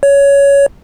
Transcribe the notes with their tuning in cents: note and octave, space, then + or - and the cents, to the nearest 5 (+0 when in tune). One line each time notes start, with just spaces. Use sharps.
C#5 +15